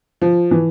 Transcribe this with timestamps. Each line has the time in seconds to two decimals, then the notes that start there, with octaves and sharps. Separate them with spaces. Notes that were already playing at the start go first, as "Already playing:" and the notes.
0.21 F3
0.51 E3